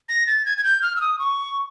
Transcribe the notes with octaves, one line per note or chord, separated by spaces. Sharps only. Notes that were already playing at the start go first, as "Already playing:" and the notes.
A#6
A6
G#6
G#6
G6
F6
E6
D#6
C#6